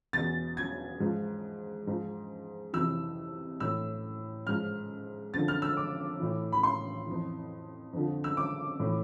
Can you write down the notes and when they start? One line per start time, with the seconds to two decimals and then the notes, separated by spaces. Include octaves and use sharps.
0.13 E2 B2 A6
0.57 G#6
1.00 G#2 F3
1.87 G#2 F3
2.73 F2 C3 E3 E6
3.60 A2 E3 E6
4.47 G#2 F3 F6
5.34 F2 D3 F3 A6
5.48 F6
5.62 E6
5.77 D6
6.20 A2 E3
6.52 B5
6.63 C6
7.06 F2 E3
7.93 F2 D3 F3
8.24 E6
8.37 D6
8.80 A2 E3